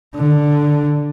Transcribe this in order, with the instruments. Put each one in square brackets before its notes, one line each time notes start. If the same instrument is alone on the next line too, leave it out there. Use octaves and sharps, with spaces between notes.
[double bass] D3